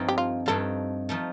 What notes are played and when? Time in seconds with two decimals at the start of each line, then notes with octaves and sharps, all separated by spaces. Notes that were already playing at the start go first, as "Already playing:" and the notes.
Already playing: G2 F3 A3 C4 D#4
0.09 G4
0.18 F4
0.46 G2 F3 A3 C4 D#4 A4
1.09 F3 A3 D#4